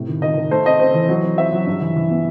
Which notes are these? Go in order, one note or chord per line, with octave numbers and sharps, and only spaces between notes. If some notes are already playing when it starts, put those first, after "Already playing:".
Already playing: A2 C3
D#3
D#3 D#5
D#3
A3 C5
C4 D#5
C4 C5
E3
F#3
C4
C4 E5
F#3
G2
E3
E3
B3